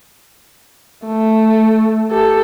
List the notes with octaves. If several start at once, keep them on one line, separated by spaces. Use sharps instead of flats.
A3
G4 A4